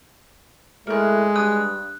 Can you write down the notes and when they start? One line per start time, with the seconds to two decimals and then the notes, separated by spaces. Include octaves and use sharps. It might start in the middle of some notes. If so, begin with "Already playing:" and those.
0.87 A2 G#3 A#4 F#6
1.36 G2 D#6 F#6